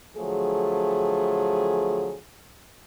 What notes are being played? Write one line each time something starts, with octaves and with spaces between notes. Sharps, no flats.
D3 F3 F#3 A3 G#4